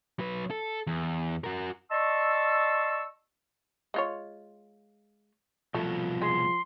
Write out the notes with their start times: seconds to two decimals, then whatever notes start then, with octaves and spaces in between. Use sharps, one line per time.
0.19 F#3 B4
0.50 A4
0.87 E2
1.44 F#4 A#4
1.91 D5 D#5 A5 C6 C#6 E6
3.94 G#3 F4 C#5
5.74 C2 B2 F3 A3
6.22 G#3 C6